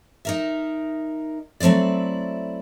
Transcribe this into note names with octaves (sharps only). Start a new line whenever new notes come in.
D#4 A#4 E5
F#3 A3 C4 E4 D5